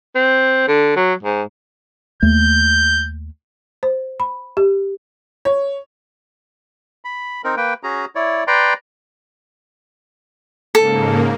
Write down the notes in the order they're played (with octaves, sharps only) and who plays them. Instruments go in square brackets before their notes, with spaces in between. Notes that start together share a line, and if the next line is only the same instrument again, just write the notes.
[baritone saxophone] C4
D3
F#3
G#2
[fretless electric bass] D#2 A3 [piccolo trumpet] G6
[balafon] C5
B5
G4
[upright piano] C#5
[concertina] B5
C4 D#4 A#4
A#3 B4 G5
C#4 F#4 G#4 A#5
E4 C#5 D5
B4 D5 G5 A#5 C6
[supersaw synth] G#2 C#3 A#3 [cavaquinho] A4